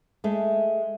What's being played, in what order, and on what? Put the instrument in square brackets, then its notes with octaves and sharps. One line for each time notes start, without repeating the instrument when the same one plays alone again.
[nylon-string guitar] G#3 A3